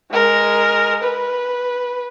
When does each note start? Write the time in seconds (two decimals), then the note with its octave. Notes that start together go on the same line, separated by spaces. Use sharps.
0.12 G#3 A#4
1.03 B4